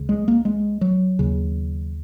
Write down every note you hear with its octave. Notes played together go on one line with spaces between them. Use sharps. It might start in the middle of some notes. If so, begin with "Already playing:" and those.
Already playing: C#2 C#3
G#3
A#3
G#3
F#3
D#2 C#3